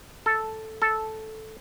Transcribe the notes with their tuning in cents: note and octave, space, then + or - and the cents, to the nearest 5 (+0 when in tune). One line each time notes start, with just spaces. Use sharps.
A4 +0
A4 -5